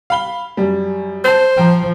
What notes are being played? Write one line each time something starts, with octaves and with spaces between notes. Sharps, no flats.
F5 B5 G7
F#2 G3
C5 A5 G6
F3 G5 A#5